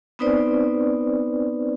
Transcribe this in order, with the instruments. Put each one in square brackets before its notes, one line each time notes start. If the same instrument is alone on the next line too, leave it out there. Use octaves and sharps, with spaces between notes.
[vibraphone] B3 C4 D#4 B4 C5 D5